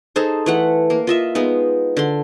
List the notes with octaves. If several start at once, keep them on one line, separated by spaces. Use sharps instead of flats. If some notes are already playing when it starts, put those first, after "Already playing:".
D#4 G#4 A4 C5
E3 A3 F#5
A#3
F4 D#5 E5
G#3 B3 D#4
D3 C6